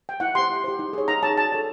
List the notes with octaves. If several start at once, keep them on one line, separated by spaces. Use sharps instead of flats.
G5
E4 F#5
G4 C5 C6
E4
G4 C5
D#4
G#4 C#5
D#4 A#5
G#4 C#5 A5
F#4 A5
A4 C#5